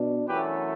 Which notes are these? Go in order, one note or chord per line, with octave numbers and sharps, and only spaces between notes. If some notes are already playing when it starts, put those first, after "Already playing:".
Already playing: B2 D4
F#2 E3 A3 C#4 G4 B4